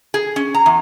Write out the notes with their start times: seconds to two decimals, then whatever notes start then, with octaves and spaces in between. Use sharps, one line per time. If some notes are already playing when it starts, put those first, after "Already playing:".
0.14 G#4
0.36 C#4
0.55 A#5
0.66 E2